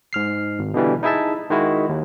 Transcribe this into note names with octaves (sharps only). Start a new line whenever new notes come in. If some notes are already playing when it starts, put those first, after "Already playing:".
G#2 F6 C7
G#1
B2 D3 E3 G3
D#4 E4 G#4 E5 A5
D#3 G#3 E4 F#4
D#2